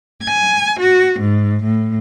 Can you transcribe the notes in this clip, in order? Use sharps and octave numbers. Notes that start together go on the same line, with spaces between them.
G#5
F#4
G#2
A2